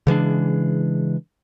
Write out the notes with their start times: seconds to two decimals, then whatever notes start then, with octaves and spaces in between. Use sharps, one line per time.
0.07 C#3 E3 G#3 D4